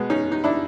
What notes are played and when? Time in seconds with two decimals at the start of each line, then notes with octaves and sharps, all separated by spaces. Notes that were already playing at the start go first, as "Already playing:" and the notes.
Already playing: B2 G#3 B3
0.10 C#4 D#4
0.32 D#4
0.44 D4 E4